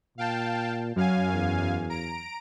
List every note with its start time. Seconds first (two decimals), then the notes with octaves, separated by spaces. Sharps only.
0.18 A#2 F5 G5 A5
0.96 F#2 F#3 F5 G#5
1.33 E2
1.90 A#5 D7